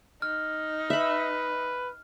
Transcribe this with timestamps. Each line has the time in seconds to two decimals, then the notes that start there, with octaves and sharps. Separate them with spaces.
0.22 D#4 F6
0.90 B4 E5 B5